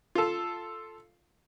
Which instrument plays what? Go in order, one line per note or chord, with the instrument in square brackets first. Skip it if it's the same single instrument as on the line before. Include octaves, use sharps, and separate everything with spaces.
[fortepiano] F4 A4